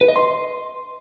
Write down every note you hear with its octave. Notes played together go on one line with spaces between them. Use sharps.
B4
D#5
C6